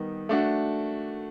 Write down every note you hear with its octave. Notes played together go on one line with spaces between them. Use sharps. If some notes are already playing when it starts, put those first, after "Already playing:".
Already playing: D#3 G3 B3 D#4
A3 D4 F#4